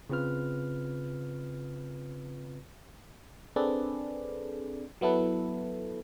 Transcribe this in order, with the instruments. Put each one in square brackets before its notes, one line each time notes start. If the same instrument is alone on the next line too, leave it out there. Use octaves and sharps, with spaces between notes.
[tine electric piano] C#3 C4 F4 B4 F6
[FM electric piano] C4 D4 G#4 A4 B4 D5
F#3 B3 E4 A4 B4